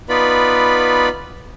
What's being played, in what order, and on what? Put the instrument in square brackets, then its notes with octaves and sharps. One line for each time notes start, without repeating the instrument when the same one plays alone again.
[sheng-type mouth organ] B3 D#4 F4 B4 D5 B5